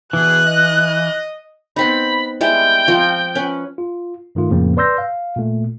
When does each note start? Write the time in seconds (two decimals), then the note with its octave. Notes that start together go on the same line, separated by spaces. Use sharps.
0.13 B2 E3 D4 G#4 F#6
0.45 D#5
1.76 B3 C4 D#4 B5
2.41 G3 G#3 E4 G5
2.88 F3 C4
3.35 C#4 B4
3.78 F4
4.35 G2 D#3 A3 F4
4.50 F2 A2 C#3 F3 A#3 C4
4.77 B4 D5 C6 E6 G6 A#6
4.98 F5
5.36 A#2 A3